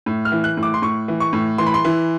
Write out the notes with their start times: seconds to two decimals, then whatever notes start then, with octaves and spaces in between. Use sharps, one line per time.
0.06 A2
0.25 F6
0.32 E3
0.44 F#6
0.57 A2
0.63 D6
0.74 C6
0.82 A2 C#6
1.08 E3
1.20 C#6
1.33 A2
1.58 E3 C6
1.67 B5
1.74 C6
1.85 E3